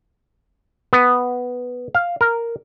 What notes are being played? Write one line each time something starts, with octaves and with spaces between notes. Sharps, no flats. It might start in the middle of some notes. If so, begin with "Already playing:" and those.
B3
F5
A#4